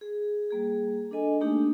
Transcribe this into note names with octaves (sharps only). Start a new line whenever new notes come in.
G#4
G3 A#3 G#4
D4 A4 D#5 G#5
A3 A#3 D4 D#4 G4